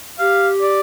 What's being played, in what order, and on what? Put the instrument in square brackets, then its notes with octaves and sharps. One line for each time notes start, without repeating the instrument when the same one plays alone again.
[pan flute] G4 [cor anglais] F5
[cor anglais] D5